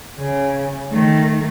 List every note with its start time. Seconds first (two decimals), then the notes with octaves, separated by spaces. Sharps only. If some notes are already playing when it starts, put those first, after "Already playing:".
0.17 C#3
0.91 D#3 A3